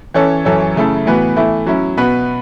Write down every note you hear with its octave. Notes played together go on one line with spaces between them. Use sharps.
E3 C#4 A4 C#5
F#2 E3 C#4 A4 C#5
C#3 A3 E4 A4
A2 E3 B3 F#4 B4
E3 A3 E4
F#3 C#4 E4
B2 B3 F#4 B4